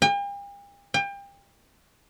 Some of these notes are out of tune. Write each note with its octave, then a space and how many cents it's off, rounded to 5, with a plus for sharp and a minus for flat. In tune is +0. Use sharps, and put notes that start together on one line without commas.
G5 +45
G5 +30